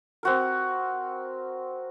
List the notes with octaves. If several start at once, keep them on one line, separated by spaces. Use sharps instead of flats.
C4 F#4 A#4